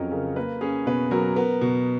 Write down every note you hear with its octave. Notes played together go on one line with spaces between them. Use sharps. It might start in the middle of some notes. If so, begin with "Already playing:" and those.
Already playing: F2 F#3 C#4 G#4 A#4 D#5
C#3 A#4
A#3 B4
C#4 G#4
B2 B4
F#3 A#4
B3 A#4
B2